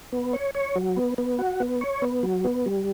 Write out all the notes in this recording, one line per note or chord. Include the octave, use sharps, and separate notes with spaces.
B3
C#5
C#5
F#3
B3
B3
F#4
B3
C#5
B3
F#3
B3
G3